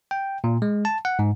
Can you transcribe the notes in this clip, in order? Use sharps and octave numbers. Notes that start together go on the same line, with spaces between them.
G5
A#2
G#3
A5
F#5
G#2